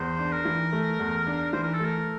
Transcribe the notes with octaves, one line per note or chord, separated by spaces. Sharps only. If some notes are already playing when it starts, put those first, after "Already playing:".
Already playing: E2 C5
D4
A#4
E3
A3
E2
D4
E3 C5
A#4
A4
A3 A#4